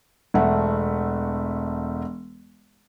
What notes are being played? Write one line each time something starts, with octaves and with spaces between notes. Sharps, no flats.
E1 A3 E5 F#5